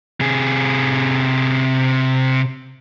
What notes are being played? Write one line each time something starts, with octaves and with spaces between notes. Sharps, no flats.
C3 G#4